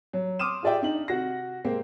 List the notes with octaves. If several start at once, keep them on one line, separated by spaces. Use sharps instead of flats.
F#3
C6 D6 D#6 F6 D#7 E7
F4 G#4 D5 E5 G5
D4 D#4 F#7
C3 F#4 A#6
C3 G#3 A#3 C4